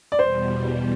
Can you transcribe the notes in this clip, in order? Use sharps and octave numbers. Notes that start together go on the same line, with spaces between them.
D5
E2 B2 G3 C5